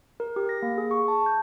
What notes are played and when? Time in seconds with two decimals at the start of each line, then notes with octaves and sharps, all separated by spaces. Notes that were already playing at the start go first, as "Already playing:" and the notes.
0.20 A#4
0.36 G4
0.49 A#6
0.62 A#3
0.78 G#4
0.91 C#6
1.08 A5
1.26 G6